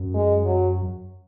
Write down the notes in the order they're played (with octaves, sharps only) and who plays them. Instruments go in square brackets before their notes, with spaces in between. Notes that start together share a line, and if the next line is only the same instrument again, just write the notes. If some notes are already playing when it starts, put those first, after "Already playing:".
Already playing: [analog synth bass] F#2
[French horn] G#3
F#3